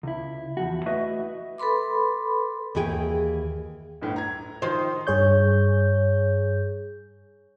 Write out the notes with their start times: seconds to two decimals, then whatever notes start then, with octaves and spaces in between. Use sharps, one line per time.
0.03 C#2 E4
0.57 E2 F3 F#4
0.86 A3 E4 F#4 B4 D#5 E5
1.58 A4 B4 B5 C6 D6
2.75 D#2 E3 G#4 G5
4.01 G1 D2 A2
4.16 A#5 G#6
4.62 D#3 F3 C5
5.07 G2 G#4 C#5 G6